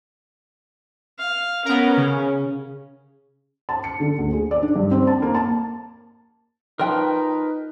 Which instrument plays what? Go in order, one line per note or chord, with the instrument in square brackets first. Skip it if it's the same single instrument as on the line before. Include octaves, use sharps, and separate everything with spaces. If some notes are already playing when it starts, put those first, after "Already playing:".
[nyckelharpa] F5
[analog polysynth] B3 A#4 [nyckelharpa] C#4
[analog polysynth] C#3
[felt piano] A5
C#7
D3
D2
G#4
D5
D4
G2
C4
A5
A#3
A5
[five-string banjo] F3 G5 [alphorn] D#4 [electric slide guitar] A#4 B4